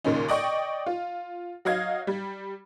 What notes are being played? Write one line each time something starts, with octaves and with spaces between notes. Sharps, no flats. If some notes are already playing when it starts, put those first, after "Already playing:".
D#2 A#2 C#3 C#4 D#4
D5 D#5 G5 C#6
F4
F#3 D#5 F5 G#6
G3